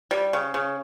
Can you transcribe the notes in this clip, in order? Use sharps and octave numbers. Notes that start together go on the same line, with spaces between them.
G3
C#3
C#3